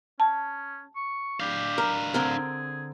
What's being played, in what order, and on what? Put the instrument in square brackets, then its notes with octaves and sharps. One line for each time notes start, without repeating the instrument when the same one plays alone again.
[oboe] C#4 [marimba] A5
[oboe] C#6
[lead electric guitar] D4 F5 [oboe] G4
[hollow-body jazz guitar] A#4
[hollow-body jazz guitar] D3 C4 A#4 [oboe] G#4